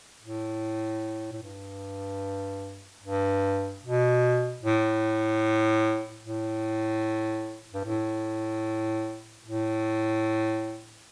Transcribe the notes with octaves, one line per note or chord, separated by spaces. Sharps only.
A2
A2
G2
G2
B2
A2
A2
G2
A2
A2